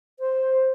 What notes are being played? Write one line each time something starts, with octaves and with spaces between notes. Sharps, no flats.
C5